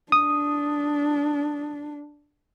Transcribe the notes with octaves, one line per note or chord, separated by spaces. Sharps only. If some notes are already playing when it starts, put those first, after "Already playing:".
D4 D#6